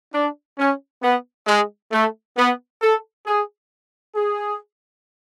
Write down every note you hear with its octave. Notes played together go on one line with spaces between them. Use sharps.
D4
C#4
B3
G#3
A3
B3
A4
G#4
G#4